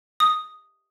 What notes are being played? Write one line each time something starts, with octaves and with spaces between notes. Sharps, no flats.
D#6